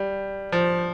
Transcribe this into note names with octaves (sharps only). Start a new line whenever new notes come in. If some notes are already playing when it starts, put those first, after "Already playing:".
Already playing: G3
F3